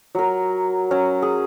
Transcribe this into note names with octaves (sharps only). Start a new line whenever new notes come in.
F#3 A#4
F#3 C#4 F#4
G#4